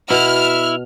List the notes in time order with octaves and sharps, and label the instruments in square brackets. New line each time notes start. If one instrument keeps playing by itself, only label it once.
[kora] B2 [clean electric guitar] E4 [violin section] F6